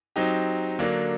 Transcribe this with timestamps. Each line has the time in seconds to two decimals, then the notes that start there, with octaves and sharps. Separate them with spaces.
0.16 F#3 C4 D#4 G4
0.79 D3 F#3 A#3 D4